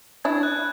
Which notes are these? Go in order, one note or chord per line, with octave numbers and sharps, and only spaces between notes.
D4 E4 G#6
F#6